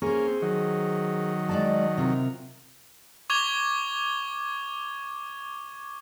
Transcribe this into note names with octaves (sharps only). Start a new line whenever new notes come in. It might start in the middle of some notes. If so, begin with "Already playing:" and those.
A#3 C#4 G#4 C5
C4
D#3 F#3
G#3 D5 A5
C3 F4 A#4
C#6 D6 G#6 F7 G7